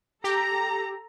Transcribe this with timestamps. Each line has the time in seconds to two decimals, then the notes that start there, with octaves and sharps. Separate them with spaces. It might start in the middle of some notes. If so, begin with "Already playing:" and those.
0.24 G4 A4 A#5